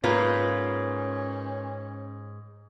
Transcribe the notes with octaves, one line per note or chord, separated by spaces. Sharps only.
G#2 A#3 C#4 F4 B4